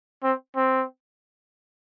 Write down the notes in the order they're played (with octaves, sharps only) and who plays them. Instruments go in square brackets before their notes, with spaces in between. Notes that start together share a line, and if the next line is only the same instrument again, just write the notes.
[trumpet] C4
C4